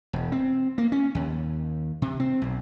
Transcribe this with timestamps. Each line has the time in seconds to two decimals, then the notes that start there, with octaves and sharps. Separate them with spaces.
0.13 E1
0.32 C4
0.78 A#3
0.92 C#4
1.15 D#2
2.02 C3
2.20 C4
2.42 B1